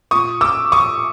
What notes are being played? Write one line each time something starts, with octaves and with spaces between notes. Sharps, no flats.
A#2 C#6 D#6
D6 E6
C#6 D#6